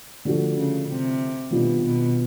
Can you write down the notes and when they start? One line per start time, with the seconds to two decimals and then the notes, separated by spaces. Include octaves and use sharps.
0.25 D3 F3 A3 D4 F#4
0.56 C#3
0.88 C3
1.51 B2 D#3 G3 B3 D4 F4
1.83 B2